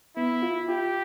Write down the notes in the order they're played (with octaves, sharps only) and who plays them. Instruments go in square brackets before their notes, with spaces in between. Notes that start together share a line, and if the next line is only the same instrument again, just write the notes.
[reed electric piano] B3 [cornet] E4
[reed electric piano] F4
[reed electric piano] F4 [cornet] G4